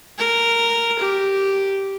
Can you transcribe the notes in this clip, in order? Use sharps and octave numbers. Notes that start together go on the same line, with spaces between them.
A#4
G4